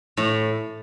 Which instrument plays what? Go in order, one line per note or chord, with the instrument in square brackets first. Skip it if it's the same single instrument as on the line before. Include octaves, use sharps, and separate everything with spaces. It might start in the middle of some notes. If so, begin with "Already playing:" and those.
[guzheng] A2